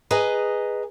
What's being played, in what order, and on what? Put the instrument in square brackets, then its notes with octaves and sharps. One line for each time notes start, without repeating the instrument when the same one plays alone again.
[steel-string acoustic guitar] G#4 B4 D#5 G#5 A#5